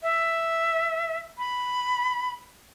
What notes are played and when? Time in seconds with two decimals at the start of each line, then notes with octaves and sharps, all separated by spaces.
0.03 E5
1.38 B5